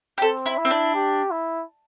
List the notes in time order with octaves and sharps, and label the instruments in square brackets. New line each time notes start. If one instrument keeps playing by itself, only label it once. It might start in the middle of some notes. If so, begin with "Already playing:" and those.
[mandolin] G4
[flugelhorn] C4 [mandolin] A4
[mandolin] E4
[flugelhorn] E4
[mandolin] C4
D4
[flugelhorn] G4
E4